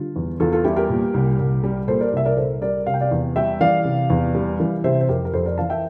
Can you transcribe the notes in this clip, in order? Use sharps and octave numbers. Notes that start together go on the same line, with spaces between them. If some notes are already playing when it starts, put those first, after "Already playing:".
Already playing: D3 G3 F4
E2
E2 F4 A4
F4 A4
G3 E4 G4
G4 A#4
A#2
C2
C2
G3
A#2 A4 C5
A#4 D5
C2 E5
A#4 D5
C2 A4 C5
G3 A#4 D5
C3 F5
G5
D5 F5
E2
G3 E5 G5
E3 D5 F5
C3
E2
G3
E3
C3 C5 E5
C5
F2 G4 A#4
A#4
F2 A4 C5
A#4 D5
E3 F5 A5
E5 G5